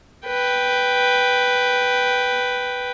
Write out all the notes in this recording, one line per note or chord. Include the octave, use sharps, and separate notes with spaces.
B4 G5